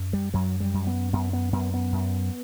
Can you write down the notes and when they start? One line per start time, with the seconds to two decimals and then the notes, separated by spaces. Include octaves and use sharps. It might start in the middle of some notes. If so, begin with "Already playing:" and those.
Already playing: F#2
0.13 G3
0.34 F#2 F#3
0.60 G3
0.74 F#2
0.87 B3
1.13 F#2 B3
1.33 B3
1.53 F#2 B3
1.74 B3
1.92 F#2